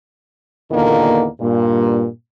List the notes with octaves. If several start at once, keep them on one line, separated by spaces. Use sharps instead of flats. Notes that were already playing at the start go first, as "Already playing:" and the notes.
E2 A#2 D3 D#3 A#3
G2 A#2